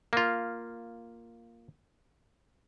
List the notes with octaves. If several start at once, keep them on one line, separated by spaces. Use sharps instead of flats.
A#3 F4